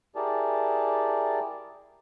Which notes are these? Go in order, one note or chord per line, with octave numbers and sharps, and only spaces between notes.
E4 G4 G#4 A#4 D5 A5